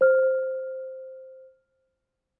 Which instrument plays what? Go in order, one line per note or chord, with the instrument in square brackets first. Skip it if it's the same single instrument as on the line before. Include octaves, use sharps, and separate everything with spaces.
[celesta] C5 F6